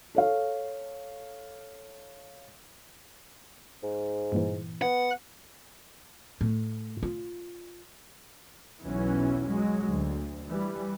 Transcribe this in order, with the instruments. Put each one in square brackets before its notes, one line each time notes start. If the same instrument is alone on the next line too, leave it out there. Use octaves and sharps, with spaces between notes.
[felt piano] A4 C#5 F5
[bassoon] G#2
[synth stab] G2 A#2 E3
[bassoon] B3 [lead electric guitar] F#5
[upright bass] A2
F4
[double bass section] B1 E2 E3 F#3 C#4
F#3 G#3
D2
E3 G3